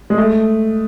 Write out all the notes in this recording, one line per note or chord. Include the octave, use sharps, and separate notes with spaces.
G#3
A3